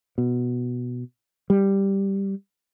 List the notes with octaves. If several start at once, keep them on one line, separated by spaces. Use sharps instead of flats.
B2
G3